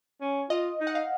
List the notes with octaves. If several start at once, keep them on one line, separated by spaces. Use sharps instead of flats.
C#4
F4 D#5
D#4
F#5
F5